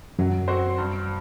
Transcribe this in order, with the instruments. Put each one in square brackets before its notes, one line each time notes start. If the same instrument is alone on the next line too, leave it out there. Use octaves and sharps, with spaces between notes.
[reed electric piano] F#2 [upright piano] F#3
[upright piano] C4 F#4 C5
G2